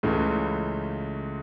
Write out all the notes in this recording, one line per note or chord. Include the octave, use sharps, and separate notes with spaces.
C#2 C#3 E3 A3